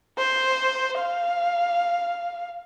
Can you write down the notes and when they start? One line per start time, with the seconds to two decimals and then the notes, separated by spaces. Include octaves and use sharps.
0.18 C5
0.99 F5